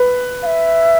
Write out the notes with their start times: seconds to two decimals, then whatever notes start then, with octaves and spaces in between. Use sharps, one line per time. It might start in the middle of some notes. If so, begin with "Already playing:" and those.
Already playing: B4
0.43 F5
0.46 E5